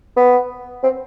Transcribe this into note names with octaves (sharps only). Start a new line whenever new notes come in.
B3
C4